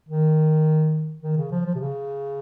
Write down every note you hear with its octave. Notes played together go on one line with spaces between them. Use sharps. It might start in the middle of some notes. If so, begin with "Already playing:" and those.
D#3
D#3
C#3
F3
F3
C3
C#3